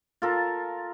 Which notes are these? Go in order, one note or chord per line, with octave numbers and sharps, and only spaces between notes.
F4 A4 A#4